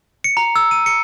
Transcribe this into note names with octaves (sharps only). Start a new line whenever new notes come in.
C#7
A#5
E6
D#7
C#7